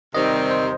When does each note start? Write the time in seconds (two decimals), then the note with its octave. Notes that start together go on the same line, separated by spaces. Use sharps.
0.15 C3 D#3 G3 C4 D#4 D#5
0.51 C5